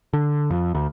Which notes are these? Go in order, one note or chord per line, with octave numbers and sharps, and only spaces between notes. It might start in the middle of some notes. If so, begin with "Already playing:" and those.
D3
F2
D2